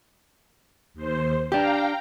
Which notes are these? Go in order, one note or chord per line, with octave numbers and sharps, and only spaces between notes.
D#2 C5
D4 G4 F5 G5 A#5